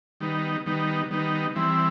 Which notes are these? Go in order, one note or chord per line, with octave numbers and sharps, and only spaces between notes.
D#3 G3 B3 D#4
D#3 G3 B3 D#4
D#3 G3 B3 D#4
E3 G3 C4 E4